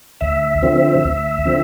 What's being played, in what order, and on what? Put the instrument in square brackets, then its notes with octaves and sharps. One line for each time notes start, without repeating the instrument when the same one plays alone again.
[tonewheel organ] D2 E5
D3 F3 C4
D2
D3 F3 C4